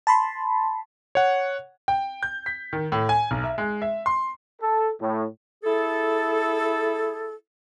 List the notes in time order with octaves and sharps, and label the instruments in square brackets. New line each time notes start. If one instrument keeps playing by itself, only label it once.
[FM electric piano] A5 B5 C6
[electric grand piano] C#5 F#5
[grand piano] G5
G6
B6
D#3
A2
G#5
B1
E5
G#3
E5
C6
[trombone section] A4
A2
[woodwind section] E4 G#4 A4